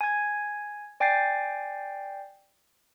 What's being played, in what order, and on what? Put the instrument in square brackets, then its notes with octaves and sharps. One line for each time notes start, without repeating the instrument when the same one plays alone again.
[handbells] G#5 G#6
D5 G5 G#5 G6 A6 C7